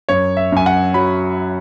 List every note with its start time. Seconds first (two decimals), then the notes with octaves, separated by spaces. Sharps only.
0.09 F#2 C#5
0.37 E5
0.52 F#2 G#5
0.66 F#5
0.94 F#3 B5